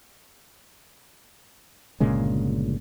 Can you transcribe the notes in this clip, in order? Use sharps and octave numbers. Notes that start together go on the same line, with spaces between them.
G1 A#2 C#3 G#3